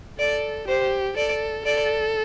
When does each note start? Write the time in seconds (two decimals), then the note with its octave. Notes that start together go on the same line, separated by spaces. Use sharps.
0.19 A4 D5
0.68 G4 C5
1.17 A4 D5
1.66 A4 D5